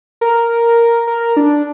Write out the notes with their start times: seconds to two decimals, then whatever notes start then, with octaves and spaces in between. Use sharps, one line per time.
0.21 A#4
1.07 A#4
1.37 D4